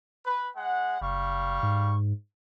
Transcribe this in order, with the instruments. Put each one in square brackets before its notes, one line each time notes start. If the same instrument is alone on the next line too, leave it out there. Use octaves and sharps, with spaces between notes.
[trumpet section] B4
G#3 F#5
[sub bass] F#1 [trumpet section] G3 F5 C#6
[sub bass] G#2